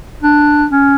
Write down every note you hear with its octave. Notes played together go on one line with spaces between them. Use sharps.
D4
C#4